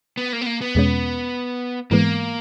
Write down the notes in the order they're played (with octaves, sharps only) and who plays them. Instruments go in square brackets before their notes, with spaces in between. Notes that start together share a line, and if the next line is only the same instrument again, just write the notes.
[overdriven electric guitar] B3
A#3
B3
A#3
B3
[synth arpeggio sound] E2 B2 G#3 C#4
[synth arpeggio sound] G#2 E3 G#3 B3 [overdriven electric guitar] A#3